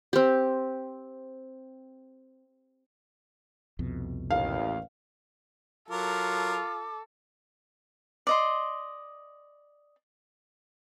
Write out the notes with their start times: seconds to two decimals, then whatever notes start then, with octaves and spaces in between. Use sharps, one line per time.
0.13 C4 G4
3.79 C2 F2 B2
4.30 A1 D#2 F5
5.90 F#3 F4 A4 A#4 D6
8.27 D5 D#5 C6